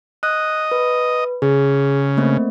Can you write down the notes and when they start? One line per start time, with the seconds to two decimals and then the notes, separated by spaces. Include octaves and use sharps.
0.23 D#5 F#6
0.72 B4
1.42 C#3 G#4
2.17 A3 A#3 C4